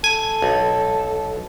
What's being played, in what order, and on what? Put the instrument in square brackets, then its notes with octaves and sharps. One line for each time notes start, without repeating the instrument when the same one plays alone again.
[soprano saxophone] A4 [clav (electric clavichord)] G#5
[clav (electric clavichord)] B1